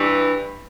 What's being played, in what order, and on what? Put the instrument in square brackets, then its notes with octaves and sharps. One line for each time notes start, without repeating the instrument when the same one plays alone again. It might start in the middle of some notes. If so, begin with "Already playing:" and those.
Already playing: [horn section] G2 E3